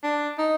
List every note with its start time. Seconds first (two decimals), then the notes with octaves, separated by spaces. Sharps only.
0.04 D4
0.39 D#4